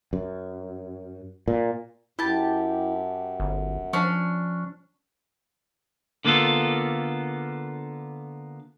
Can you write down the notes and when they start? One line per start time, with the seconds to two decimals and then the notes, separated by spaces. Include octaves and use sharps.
0.13 F#2
1.48 A#2
2.19 F#2 E4 G4 A5
3.40 G1
3.93 F3 C#4 D4
6.25 D3 A#3 B3 F4 A4